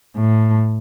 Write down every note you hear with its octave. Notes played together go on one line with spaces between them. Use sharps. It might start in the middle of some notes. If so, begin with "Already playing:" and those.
A2